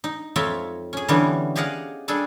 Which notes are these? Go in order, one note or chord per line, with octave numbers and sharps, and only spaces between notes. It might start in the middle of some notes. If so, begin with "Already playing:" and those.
D#4
F2 C#5 E5 F5 A5 C6
C#4 G#4
D3 E3 G3 B3 C#4
G4 G#4 D5 D#5 F5 F#5
G3 D4 G#4 A4 D5